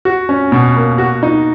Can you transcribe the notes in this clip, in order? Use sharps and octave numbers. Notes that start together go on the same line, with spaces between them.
F#4
C#4
B2
A#3
F#4
D#4